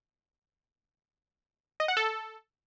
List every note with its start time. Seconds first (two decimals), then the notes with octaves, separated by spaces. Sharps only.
1.80 D#5
1.88 F#5
1.97 A4